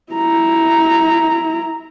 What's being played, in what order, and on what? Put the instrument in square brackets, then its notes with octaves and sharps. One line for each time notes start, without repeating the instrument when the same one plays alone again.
[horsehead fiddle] E4 A#5